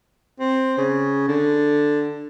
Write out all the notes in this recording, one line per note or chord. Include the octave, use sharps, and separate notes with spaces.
C4
C#3
D3